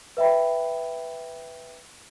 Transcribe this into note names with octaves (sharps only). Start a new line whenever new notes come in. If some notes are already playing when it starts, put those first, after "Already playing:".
B4 E5 G5 B5